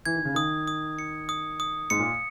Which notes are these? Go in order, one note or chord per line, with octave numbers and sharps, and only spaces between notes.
E3 G#6
D#3
C#3
D#3 D#6
D#6
C#7
D#6
D#6
G#2 C#7
A#2